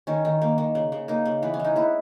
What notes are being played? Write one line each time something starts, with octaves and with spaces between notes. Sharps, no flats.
D#3 C#4
D#3
A#3
D#3
C#3
C#3
A#3 D#4
C#3
E3 B3
C#4
G#3 D#4
B3 E4